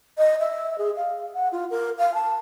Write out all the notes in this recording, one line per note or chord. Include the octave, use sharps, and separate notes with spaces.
D#5
E5
G#4
F5
F#5
F4
A#4
F5
A5